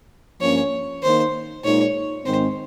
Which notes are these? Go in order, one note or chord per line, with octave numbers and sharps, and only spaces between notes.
G2 F3 A#3 C#4 C#5
D#3 A#3 D#4 C5
A#2 G#3 D#4 C#5
G#2 D#3 G#3 C4 C5